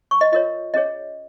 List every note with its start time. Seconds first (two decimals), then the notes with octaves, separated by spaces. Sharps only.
0.11 C#6
0.21 D#5
0.32 F4 A#4 C#5 D#5
0.74 C#4 G#4 C#5 D#5